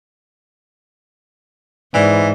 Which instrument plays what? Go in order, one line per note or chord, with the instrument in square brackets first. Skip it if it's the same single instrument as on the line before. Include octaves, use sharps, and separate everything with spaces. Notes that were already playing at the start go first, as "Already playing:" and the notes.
[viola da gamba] G#2 [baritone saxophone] E3 [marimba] D5 B5